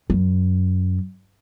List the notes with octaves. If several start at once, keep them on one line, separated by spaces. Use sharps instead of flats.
F#2